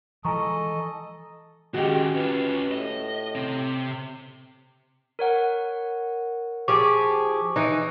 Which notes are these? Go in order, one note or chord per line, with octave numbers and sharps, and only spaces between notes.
E3 F3 G#3 A4 D#5 G#5 A#5 C#6
D#3 G#3 C#4 F#4 G4
C#4 F4 B4
A2 D#5
C3 C4
A#4 C#5 F#5
F3 G4 G#4 C#6 D6
E3 D#4